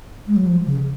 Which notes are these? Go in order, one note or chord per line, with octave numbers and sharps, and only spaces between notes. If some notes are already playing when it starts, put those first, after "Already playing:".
G#3
F#3
F3
C#3